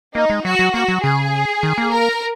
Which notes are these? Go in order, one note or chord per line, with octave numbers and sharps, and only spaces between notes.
A#3 D#4
G#3
F#3 F#4
F#3
A#3 F#4
F#3
C#3 G#4
D#3
A#3
A#4